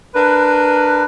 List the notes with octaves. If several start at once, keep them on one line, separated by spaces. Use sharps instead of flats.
D4 A#4 B4